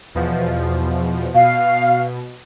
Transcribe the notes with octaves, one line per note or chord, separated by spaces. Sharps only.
E2 B2 F3
B2 F5